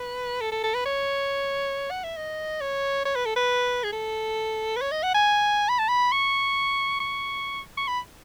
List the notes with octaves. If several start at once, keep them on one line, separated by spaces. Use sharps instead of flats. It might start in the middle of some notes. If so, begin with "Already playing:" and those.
Already playing: B4
A4
A4
A4
B4
C#5
F#5
E5
D#5
C#5
C#5
B4
A4
B4
G#4
A4
B4
C#5
D#5
F#5
G#5
B5
A5
B5
C#6
C#6
C#6
B5